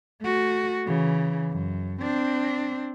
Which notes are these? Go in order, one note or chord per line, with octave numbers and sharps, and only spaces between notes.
A3 F#4
C#3 E3
F#2
C4 D4